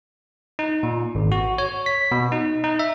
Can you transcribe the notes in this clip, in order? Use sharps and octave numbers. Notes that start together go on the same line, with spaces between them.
D#4
A#2
G#1
F#4
C#5
B6
B2
D#4
D#4
E5